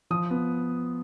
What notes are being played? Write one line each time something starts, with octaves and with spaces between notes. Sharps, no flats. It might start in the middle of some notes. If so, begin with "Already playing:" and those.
F3 D#6
B3